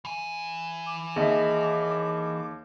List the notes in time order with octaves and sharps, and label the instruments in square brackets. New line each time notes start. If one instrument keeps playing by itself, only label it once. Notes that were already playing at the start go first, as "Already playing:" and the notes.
[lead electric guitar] E3 G#5
[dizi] D6
[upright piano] D#2 E5 [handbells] G#4 D#5